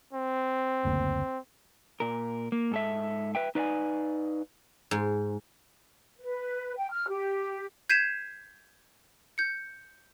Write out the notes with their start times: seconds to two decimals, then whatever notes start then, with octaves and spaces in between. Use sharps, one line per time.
0.13 C4
0.85 F#1 D2 A#3
2.00 A#2 A#4
2.52 A#3
2.71 G#2 A4 E5
3.35 B4 E5 G5
3.55 D#4 B4 D5 E5 F5 G#5
4.91 G#2
6.18 B4
6.77 G5
6.91 F6
7.09 G4
7.90 G6 G#6 B6 C7 D#7 E7
9.38 G6 C#7